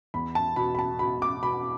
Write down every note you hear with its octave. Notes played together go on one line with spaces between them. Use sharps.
E2 B5
A5
B2 B5
B5
A5
B2 B5
D6
B2 B5